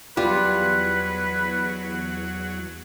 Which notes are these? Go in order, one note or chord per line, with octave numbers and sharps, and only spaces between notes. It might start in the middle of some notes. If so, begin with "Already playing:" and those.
E2 F#3 G3 F4 B4